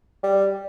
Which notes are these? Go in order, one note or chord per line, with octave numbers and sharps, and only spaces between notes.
G3